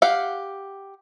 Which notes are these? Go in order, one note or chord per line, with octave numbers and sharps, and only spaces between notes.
G4 F5 F#5